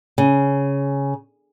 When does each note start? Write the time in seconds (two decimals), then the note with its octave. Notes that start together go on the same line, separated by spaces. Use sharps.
0.18 C#3